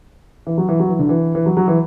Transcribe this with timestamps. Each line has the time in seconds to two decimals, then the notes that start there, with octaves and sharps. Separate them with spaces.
0.47 E3
0.58 F#3
0.69 E3
0.79 F#3
0.89 E3
0.99 D3
1.09 E3
1.35 E3
1.46 F#3
1.57 F#3
1.68 E3